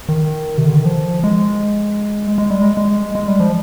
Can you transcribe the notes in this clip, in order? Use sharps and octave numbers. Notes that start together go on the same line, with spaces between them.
D#3
C3
D3
D#3
F3
G#3
G#3
G3
G#3
G#3
G#3
G3
F3